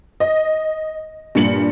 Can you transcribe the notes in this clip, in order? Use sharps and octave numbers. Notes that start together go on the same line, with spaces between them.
D#5
G2 A#2 C#7 F#7